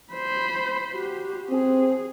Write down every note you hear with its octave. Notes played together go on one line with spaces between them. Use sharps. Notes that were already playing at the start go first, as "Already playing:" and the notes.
C5 B5
F#4 G4
C4 G#4